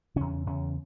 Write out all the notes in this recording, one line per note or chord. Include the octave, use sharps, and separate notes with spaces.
E2 C#3 C#4
E2 C#3 C#4